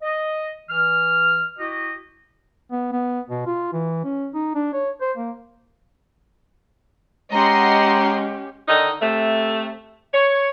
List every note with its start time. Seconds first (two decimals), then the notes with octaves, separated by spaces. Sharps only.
0.02 D#5
0.69 E3 F6
1.59 E4 F#4 G4 D#5
2.71 B3
2.92 B3
3.30 B2
3.46 F4
3.73 E3
4.04 C#4
4.34 D#4
4.55 D4
4.73 C#5
5.01 C5
5.17 A#3
7.32 G#3 C#4 G4 D#5 F#5 A#5 C6
8.68 D3 D#3 D#4
9.01 C3 A3
10.14 C#5